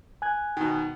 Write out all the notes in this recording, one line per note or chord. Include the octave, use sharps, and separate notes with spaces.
G#5 F#6 G#6
B2 D#3